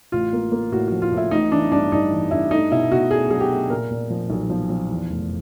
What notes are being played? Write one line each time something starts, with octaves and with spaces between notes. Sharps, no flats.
A1 F4
A#3
A#3
A2 F#4
F3 F#4
F4
A2
E4
A1 D#4
E3 D4
G2 D4
G2 D#4
E3
G2 E4
A3 D#4
B2 E4
B2 F#4
A3 G#4
F#3 G#4
G4
A3
A#2 A#4
A#2
F3
B1
F3
F3
E2
F1